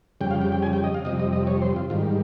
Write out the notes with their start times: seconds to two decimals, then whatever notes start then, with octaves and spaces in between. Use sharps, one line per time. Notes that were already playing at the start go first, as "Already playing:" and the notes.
0.21 F2 C#3 G3 G5
0.31 F5
0.41 G5
0.52 G5
0.62 G#5
0.73 G5
0.84 D#5
0.94 F5
1.05 F2 C3 G3 D#5
1.20 D#5
1.33 D#5
1.47 C#5
1.62 C5
1.76 F4
1.90 G#2 D#3 G3 F4